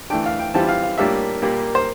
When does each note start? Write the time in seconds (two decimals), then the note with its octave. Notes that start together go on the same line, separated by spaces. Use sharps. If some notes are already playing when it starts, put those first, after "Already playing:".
0.10 E3 A3 D4 G5
0.26 F5
0.39 G5
0.54 E3 G3 C4 F4 A5
0.69 F5
0.84 F5
0.98 A2 G3 A#3 D4 F4 E5
1.42 A#2 G3 A#3
1.75 C5